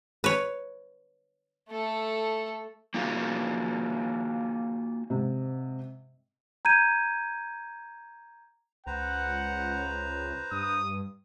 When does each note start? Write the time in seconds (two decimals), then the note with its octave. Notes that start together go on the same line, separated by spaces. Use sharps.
0.24 B4 C#5
1.69 A3 A4
2.94 A#3 D#4 F4 F#4 G#4
5.10 G#2 C3
6.65 A#5 G6 G#6 D#7
8.87 C#2 B4 C5 F#5 A#5
10.52 G2 D#6